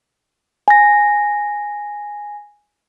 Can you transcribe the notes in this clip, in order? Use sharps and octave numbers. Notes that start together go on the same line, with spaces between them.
G#5 A#6